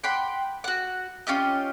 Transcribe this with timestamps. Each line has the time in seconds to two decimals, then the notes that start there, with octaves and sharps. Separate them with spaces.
0.04 F#5 G5 B5 C6
0.64 F#4 F#5
1.27 C#4 F4 G4 D#5